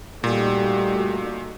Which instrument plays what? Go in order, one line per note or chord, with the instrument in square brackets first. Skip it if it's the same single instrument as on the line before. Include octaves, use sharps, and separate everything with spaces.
[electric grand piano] A#2 [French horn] G3 [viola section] A3 D#4 F#4